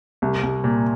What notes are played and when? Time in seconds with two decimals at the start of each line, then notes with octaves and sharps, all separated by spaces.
0.22 C2
0.43 C2
0.64 A#2